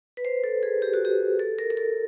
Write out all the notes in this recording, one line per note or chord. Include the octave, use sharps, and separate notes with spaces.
B4
C5
A4
G#4
G4
F#4
G4
A4
A#4
A#4
A4